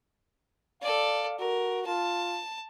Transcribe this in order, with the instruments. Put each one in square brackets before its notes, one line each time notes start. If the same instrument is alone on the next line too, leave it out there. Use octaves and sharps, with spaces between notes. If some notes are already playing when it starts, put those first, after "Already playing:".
[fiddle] A4 D5 [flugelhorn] F5
[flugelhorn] F#4 [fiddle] A#4
[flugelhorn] F4 [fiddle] A5